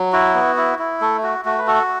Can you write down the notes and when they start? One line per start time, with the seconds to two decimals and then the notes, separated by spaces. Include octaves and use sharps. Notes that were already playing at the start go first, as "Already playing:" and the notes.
Already playing: F#3
0.13 E4 F#4
0.34 B3
0.57 E4
0.79 E4
1.01 A3 A4
1.23 F#4
1.45 A3 F#4
1.58 B4
1.67 F#4 A4